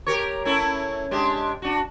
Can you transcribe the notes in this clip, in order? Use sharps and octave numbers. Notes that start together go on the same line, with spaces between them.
G4 A#4 C#5
A3 C#4 E4
G#3 D4 G4
D4 F#4